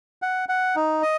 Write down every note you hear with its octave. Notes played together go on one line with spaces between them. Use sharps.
F#5
F#5
D#4
D#5